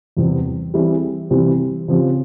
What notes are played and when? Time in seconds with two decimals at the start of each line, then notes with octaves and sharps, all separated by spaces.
0.17 E2 C3 G3 C4
0.74 E3 G3 C4 E4 G#4
1.30 C3 E3 G3 C4
1.88 C#3 F3 C4 G4